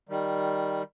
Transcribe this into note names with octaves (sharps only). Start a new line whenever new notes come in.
D#3 G3